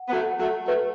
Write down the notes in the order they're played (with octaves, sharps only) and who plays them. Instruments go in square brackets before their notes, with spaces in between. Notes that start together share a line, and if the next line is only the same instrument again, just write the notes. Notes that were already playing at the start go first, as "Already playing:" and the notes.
Already playing: [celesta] F#5
[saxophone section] B3
F#3 A3
[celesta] F#5
[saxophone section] F#3 A3
[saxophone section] F#3 A3 [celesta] B4